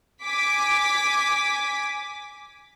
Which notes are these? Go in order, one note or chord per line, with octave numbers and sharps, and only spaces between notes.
G#5 D6 B6